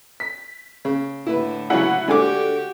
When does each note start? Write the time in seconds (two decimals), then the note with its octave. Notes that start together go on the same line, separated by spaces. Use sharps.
0.20 B6
0.85 C#3
1.27 A2 D3 E4 B4
1.70 C#2 F#3 E4 F#5
2.08 D3 G#3 F#4 G4 G#5 D6